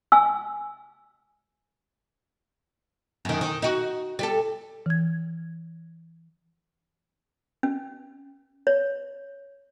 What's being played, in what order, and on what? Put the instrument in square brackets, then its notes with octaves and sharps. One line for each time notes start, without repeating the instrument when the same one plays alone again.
[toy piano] G#5 E6
[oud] F#2 D#3
D#3
D#4 F#4
G3 G4 A4
[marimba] E3 G#6
[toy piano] C#4
C#5